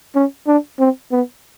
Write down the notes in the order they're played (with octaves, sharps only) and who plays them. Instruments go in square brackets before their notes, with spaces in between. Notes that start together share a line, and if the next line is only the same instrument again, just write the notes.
[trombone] C#4
D4
C4
B3